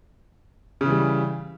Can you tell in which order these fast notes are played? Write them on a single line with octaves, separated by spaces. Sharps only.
C#3 E3 G3